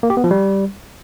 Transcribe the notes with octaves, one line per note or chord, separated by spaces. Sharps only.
A#3
G4
B3
F3
G3